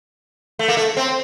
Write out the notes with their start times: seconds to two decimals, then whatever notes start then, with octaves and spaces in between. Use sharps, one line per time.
0.59 A3
0.68 A#3
0.77 A3
0.97 C4